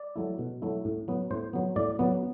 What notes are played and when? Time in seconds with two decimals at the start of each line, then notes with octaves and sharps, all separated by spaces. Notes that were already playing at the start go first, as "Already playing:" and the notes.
Already playing: D5
0.16 F#3 A3 E4
0.39 B2
0.62 F#3 A3 E4
0.85 A2
1.08 F#3 B3
1.31 A2 C5
1.53 F#3 B3
1.76 A2 D5
1.99 F#3 B3